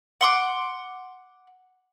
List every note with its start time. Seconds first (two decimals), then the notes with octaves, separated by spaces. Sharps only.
0.21 F#5 C6 D6